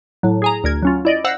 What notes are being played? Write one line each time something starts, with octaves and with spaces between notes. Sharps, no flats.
A2 F#3
G#4 G#5 A#5
D2 A#4 G#6
F#3 C#4 F4
E4 D5 D#5
C5 F5 F#5 E6 F#6 A#6